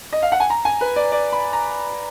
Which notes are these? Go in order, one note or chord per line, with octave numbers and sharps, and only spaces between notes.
D#5
F5
F#5
G#5
A#5
G#5
B4
D5
D5
B5
A#5